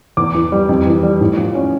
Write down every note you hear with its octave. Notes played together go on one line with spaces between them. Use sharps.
E2 D6
E3
G3
F2
E3
G3
A2
F3
C#4